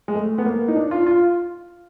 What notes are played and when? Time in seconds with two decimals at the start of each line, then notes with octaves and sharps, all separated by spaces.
0.08 G#3
0.15 A3
0.38 B3
0.45 A#3
0.68 D#4
0.76 D4
0.91 F4
1.07 F4